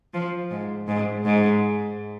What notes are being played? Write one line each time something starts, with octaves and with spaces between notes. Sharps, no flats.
F3
G#2
G#2
G#2